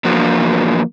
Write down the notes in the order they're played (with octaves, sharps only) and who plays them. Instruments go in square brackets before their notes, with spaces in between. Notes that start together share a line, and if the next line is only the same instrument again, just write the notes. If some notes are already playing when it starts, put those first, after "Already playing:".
[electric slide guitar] E2 F3 A#3 D4 F#4